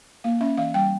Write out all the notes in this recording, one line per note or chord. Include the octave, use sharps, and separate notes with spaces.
A#3 F5
C#4 E5
E3 F5
G3 G5